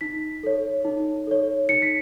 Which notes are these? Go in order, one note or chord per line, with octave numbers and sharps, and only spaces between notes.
D#4 B6
A4 C#5
D#4
A4 C#5
D#4 C#7
B6